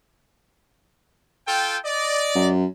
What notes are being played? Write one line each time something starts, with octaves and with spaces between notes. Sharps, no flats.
F4 A4 G5
D5 D#5
F#2